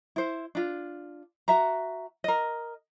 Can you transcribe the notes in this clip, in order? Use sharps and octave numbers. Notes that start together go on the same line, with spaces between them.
E4 C5
D4 F4
F#4 E5 A#5
A#4 D#5